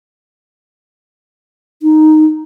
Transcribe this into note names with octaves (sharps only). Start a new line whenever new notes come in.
D#4